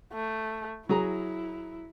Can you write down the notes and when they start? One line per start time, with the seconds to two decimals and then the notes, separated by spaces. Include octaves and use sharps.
0.13 A3
0.89 F#3 E4 G#4 A#5